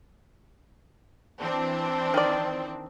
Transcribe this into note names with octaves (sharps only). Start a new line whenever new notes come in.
E3 C4 D4
D#3 D5